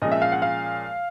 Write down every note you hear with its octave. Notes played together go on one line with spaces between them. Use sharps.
A#2 F3 G#3 C#4 D#5
E5
F5
F#5
F5